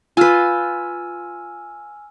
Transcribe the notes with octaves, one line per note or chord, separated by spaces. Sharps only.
F4 B4 G#5 E6 F6